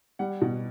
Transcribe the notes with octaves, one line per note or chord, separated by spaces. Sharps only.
G3 F#5
B2